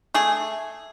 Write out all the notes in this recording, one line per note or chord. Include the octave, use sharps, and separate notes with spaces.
A3 G#4